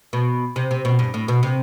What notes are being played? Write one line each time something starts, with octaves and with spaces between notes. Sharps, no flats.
B2
C3
C3
B2
G2
A2
B2
C3